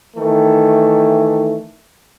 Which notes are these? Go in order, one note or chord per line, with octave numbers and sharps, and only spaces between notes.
D#3 E3 A3